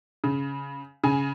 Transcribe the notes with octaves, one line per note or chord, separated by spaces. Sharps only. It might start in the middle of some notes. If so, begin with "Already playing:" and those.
C#3
C#3 G#5